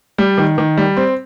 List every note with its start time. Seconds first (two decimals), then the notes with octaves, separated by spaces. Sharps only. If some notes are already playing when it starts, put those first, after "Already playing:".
0.18 G3
0.38 D#3
0.58 D#3
0.77 G3
0.97 C4